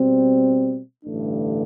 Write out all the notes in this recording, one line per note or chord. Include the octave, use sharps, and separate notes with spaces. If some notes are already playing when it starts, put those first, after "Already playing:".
Already playing: B2 G3 C4
A1 G2 D3 A3 D4